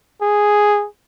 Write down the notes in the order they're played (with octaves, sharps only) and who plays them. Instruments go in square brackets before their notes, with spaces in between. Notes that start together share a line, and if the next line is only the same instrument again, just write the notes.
[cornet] G#4